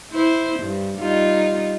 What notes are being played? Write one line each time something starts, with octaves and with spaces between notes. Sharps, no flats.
E4 C5
G2
G3 D#4 F4